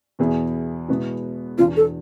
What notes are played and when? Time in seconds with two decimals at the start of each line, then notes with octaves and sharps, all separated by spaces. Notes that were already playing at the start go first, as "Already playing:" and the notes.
0.19 E2 B2 B3 E4 G#4
0.88 B2 G#3 B3 E4
1.58 E2 B2 B3 D4 F4
1.77 A4